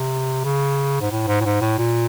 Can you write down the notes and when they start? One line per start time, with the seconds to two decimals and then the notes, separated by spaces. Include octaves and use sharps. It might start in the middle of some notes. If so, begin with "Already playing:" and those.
Already playing: C3
0.45 C#3
1.01 G#2
1.11 A2
1.27 G#2
1.41 A2
1.45 G#2
1.61 A2
1.78 A#2